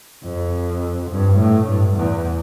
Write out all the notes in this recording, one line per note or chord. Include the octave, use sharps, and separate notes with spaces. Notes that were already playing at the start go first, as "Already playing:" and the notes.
F2
G2
A2
G2
E2